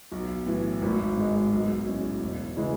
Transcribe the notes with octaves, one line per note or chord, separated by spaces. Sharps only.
B1
A2 E3
G#1
G#2 G#3
B1
A2 G#3 C#4
E1
C#3 E3 G#3